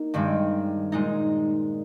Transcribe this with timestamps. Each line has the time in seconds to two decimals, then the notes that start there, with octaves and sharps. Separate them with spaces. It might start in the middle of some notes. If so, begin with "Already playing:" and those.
Already playing: A#3 D#4
0.14 G2 D#3 G#3 C4
0.92 A#2 G#3 D#4